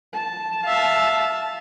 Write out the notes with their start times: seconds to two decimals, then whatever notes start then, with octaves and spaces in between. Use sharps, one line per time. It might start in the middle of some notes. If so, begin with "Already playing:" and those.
0.13 A5
0.65 E5 F5